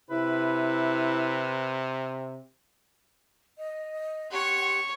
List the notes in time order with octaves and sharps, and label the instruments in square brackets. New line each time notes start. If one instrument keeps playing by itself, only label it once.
[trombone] C3 [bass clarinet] E4 [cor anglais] B4
[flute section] D#5
[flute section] G4 F#5 C6 [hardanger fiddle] C#5 C#6